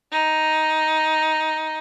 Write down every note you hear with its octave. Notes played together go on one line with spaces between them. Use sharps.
D#4